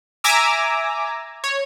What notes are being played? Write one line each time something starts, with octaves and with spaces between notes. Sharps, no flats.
E5 G#5 A#5 D6 E6
C#5